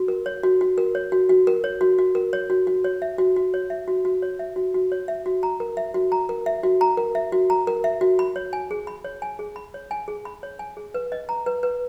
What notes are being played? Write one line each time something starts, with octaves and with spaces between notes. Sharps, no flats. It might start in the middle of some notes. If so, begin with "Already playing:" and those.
Already playing: F#4
A#4
C#5
F#4
F#4
A#4
C#5
F#4
F#4
A#4
C#5
F#4
F#4
A#4
C#5
F#4
F#4
C#5
E5
F#4
F#4
C#5
E5
F#4
F#4
C#5
E5
F#4
F#4
C#5
E5
F#4
A#5
A#4
E5
F#4
A#5
A#4
E5
F#4
A#5
A#4
E5
F#4
A#5
A#4
E5
F#4
B5
C#5
G#5
G#4
B5
C#5
G#5
G#4
B5
C#5
G#5
G#4
B5
C#5
G#5
G#4
B4
D#5
A#5
B4
B4